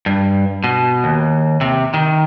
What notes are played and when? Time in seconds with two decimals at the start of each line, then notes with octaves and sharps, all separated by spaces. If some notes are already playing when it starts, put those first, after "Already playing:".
0.06 G2
0.64 B2
1.04 D#2
1.61 C3
1.94 D#3